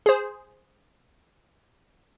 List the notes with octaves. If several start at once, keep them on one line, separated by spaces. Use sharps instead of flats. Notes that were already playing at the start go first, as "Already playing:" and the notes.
G#4 C5